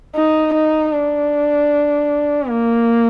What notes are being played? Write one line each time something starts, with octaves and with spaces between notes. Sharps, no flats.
D#4
D#4
D4
A#3